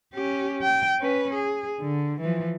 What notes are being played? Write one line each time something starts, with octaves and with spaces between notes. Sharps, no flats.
C#4 G4
G5
C#4 B4
G#4
D3
E3 F3